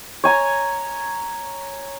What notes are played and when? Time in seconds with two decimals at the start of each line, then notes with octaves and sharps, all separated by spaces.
0.24 C#5 G#5 A#5